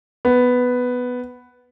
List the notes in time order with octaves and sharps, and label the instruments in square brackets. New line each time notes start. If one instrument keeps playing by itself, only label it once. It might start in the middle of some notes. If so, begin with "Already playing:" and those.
[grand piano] B3